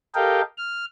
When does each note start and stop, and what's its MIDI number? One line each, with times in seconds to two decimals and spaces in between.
0.15 0.41 67
0.15 0.41 69
0.15 0.41 70
0.15 0.41 75
0.15 0.41 77
0.15 0.41 79
0.58 0.85 89